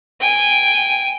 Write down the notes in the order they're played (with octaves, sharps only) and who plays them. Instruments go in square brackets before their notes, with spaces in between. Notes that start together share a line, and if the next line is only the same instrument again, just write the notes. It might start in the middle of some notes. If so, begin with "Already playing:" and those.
[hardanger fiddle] G5 G#5